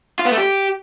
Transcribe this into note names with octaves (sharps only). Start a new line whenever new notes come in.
F4
B3
A3
G4